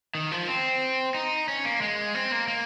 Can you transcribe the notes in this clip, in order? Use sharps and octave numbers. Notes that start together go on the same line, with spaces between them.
D#3
F3
C4
D#4
C#4
A#3
G#3
C4
A#3
A#3